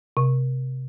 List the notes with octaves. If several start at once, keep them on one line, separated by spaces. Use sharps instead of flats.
C3